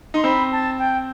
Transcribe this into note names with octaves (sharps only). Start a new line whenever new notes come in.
D#4 C6
C4 B5
A5
G5